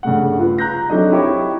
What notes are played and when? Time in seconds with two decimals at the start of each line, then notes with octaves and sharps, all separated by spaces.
0.03 G2 C#3 A3 F#5
0.39 F4 B4
0.58 A#5 F#6 G6 A#6
0.90 F#3 C4 D4 D#4 A4 D#5
1.12 E4 G4 C#5 E5 D6